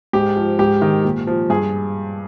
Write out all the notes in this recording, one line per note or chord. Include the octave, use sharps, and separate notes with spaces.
G#2 G4
F3
G#2 G4
D#3
A#2
F3
G2 G#4